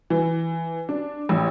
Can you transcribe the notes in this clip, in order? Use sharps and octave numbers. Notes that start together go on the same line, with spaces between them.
E3
D4
A1